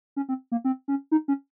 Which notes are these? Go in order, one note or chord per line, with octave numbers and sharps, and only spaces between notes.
C#4
C4
A#3
C4
C#4
D#4
C#4